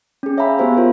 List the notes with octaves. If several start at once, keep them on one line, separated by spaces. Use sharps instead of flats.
C#4 G#4
C#5 E5 F5 G#5 A#5 B5
B3 F#4 G4 C5 F5 A#5
F4 A#4 C5